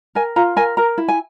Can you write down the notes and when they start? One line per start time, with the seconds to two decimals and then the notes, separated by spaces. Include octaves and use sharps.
0.15 A#4 G#5
0.36 F4 A#5
0.56 A#4 G#5
0.77 A#4 A#5
0.98 E4
1.08 G#5